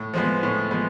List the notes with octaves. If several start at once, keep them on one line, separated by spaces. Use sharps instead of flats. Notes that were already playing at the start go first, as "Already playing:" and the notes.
Already playing: A2
F3 G#3 B3
A2
F3 G#3 B3